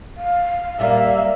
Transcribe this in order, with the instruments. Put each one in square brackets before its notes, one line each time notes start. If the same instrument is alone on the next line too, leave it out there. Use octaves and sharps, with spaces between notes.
[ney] F5
[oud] A#2 G3 F4 [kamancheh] A#3 E5